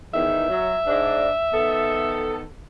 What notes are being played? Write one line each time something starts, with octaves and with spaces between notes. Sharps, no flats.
E2 D#3 E5
F#3
G#2 D4
D#3 B3 A4